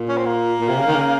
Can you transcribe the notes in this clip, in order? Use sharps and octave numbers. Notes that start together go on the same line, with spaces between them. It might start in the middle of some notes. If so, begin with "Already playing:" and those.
Already playing: A#2
C#4
C4
A#3
A#2
C3
C#3
D#3
C#3